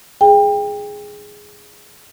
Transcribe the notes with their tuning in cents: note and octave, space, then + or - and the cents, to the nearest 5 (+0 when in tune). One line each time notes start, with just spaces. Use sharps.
G#4 +0 G5 +25